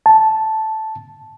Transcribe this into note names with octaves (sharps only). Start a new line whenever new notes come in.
A5